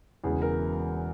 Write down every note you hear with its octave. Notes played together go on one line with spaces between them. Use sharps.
E1 E2 C#3 E3 G#4
A#4